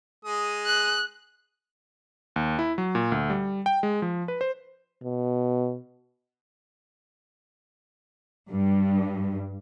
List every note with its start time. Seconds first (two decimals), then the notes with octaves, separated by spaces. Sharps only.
0.25 G#3 D#6
0.66 F#6
2.36 D#2
2.59 E4
2.78 F#3
2.95 A#2
3.12 D2
3.30 G3
3.66 G5
3.83 G#3
4.02 F3
4.28 B4
4.41 C5
5.03 B2
8.50 G2